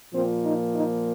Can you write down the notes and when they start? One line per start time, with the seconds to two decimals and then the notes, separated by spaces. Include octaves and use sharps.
0.14 A#2 F3 A#3 C4
0.45 D#4
0.75 D#4